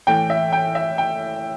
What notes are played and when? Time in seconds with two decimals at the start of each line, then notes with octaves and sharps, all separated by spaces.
0.07 A2 E3 A3 G5
0.30 E5
0.53 G5
0.75 E5
0.98 G5